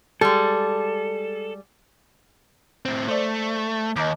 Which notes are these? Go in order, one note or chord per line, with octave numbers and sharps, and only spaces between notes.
G3 G#3 A4
A2 C4
A3 C5 D5
D#2 D#5 A#5 D6